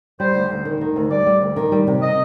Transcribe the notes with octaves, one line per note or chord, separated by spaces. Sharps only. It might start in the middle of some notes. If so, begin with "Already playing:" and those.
G3 C5
D2
D2
D#3
D#3
D2
G3 D5
G3
D2
D#3
G3
C3
D#5